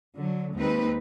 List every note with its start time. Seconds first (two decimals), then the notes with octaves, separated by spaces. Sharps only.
0.15 D3 F#3
0.56 D#2 G#3 C4 D#4 B4